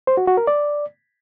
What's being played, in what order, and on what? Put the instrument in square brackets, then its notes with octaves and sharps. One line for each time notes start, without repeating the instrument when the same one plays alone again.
[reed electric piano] C5
F#4
F#4
A#4
D5